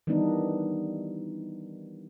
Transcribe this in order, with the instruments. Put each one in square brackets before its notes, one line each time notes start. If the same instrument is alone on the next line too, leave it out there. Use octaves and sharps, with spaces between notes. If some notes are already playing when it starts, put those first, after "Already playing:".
[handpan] D#3 E3 G3 B3 D4 D#4